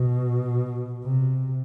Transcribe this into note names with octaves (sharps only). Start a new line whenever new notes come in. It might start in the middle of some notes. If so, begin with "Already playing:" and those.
Already playing: B2
C3